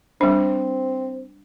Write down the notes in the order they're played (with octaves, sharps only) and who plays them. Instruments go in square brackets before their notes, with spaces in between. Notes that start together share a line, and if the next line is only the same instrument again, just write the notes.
[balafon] G3 D4 [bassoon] C4